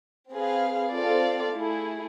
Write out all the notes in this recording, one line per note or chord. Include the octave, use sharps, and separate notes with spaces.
C4 G#4 B4 F5
C4 F4 A4 D5 F5
A3 E4 G#4